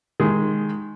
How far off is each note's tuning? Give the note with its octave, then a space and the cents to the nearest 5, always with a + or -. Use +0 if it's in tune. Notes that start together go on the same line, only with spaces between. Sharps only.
D#3 +0 G#3 +0